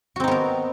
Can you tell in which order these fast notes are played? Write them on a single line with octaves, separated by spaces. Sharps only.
F#4 C4 D#4 B3 A#4